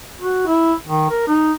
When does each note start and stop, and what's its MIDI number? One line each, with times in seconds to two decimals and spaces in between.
0.20 0.46 66
0.47 0.73 64
0.88 1.07 51
1.10 1.23 70
1.28 1.52 63